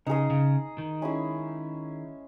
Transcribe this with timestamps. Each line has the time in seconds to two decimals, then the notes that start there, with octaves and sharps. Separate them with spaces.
0.06 C#3 D#4 G#4 D#5
0.30 C#3
0.78 D#3
1.02 G#3 C#4 E4 G#4